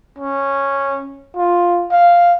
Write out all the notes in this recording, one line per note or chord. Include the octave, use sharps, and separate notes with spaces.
C#4
F4
F5